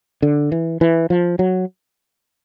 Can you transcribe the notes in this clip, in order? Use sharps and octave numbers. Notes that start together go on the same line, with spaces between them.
D3
E3
E3
F3
F#3